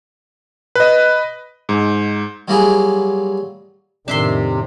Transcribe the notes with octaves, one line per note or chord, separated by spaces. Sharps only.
B4 D#5
G#2
F#3 G3 A#3 E4 F4 G#4
F2 A2 C3 D#3 D4 E5 C6